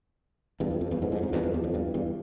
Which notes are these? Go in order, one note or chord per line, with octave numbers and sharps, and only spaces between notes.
E2 G2
F2
F2
E2 G2
F2 G#2
F2 G#2
F2 G#2
E2 G2
F2
E2
F2
E2 G2
E2 G2